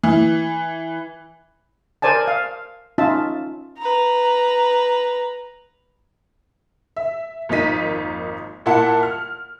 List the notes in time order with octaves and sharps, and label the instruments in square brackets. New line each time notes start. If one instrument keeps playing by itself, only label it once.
[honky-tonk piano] E3
[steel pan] A#4 C5 D5 G#5 A5
F5
C#4 D#4 F4 E5 A5
[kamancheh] B4 A#5
[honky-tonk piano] E5
G#1 F2 A#3 D#4 B6 D#7
A#2 E4 F#5 A5
F6